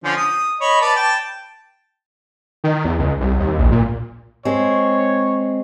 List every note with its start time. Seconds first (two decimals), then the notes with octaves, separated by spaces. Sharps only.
0.04 D3 F3 C#4
0.16 D#6
0.61 C#5 D#5 B5
0.81 B4 D5 A5
0.96 G5 A5
2.64 D#3
2.85 E2
2.99 C#2
3.21 C2
3.39 D#2
3.58 A#1
3.72 A#2
4.45 G#3 C4 C#5